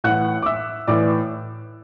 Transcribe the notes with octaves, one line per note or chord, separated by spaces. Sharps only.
A2 E3 F#5 F#6
D6
E5 E6
A2 E3 D5 D6